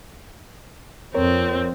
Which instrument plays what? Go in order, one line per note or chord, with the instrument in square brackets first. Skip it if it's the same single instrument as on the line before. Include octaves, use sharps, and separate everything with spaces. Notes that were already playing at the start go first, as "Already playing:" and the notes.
[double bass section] F2 [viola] C4 [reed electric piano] A#4 C#5